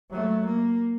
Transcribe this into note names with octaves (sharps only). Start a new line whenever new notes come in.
F#3 A3
A#3